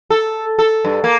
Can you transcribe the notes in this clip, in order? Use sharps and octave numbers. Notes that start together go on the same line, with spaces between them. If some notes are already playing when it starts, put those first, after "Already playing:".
A4
A4
G2
A#3